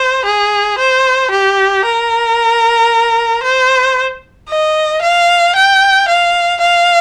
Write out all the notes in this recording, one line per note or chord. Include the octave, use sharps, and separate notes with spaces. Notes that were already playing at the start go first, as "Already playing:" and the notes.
Already playing: C5
G#4
C5
G4
A#4
C5
D#5
F5
G5
F5
F5